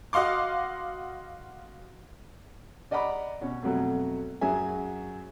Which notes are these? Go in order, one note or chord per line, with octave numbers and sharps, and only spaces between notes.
F#4 D#5 F5 C6 D6
D5 D#5 F#5 A#5 B5 D6
B2 C#4
F2 B2 F#3 A3
F#2 F#3 G#4 E5 G#5